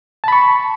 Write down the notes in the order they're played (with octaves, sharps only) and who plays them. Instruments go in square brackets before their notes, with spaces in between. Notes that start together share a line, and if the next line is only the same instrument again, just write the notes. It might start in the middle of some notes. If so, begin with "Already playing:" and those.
[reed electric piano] A5
B5
C#6